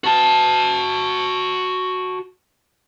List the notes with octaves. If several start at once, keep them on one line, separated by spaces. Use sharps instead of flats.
F#4 A5